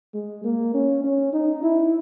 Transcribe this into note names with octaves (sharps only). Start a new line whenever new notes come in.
G#3
A#3
C#4
C#4
D#4
E4